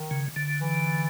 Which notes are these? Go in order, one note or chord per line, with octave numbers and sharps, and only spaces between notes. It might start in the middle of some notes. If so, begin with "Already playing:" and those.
Already playing: D#3
C#3
D3
E3